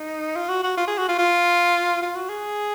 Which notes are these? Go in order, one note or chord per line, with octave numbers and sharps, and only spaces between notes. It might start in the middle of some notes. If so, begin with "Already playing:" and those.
Already playing: D#4
F4
F#4
F#4
F4
G#4
F#4
F4
F4
F4
F#4
G#4